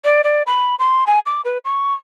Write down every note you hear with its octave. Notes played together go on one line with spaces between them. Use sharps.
D5
D5
B5
C6
G#5
D6
B4
C#6